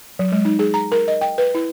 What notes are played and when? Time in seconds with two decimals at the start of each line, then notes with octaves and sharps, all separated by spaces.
0.19 F#3
0.32 G#3
0.45 D#4
0.59 G#4
0.74 A#5
0.92 A#4
1.08 D#5
1.21 G5
1.38 B4
1.55 E4